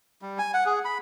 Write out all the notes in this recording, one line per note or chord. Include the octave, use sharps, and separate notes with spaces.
G3
G#5
F#5
G#4
B5